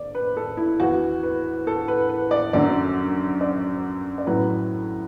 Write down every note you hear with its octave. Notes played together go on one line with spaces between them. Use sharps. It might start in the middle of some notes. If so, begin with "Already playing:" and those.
Already playing: D5
B4
A4
E4
E2 E3 F#4
B4
A4
B4
B4
D5
F#2 D3 F#3 D5
D5
D5
A2 F#3 B4